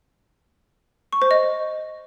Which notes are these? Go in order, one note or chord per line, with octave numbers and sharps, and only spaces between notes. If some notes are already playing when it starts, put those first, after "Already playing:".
C#6
C5
D#5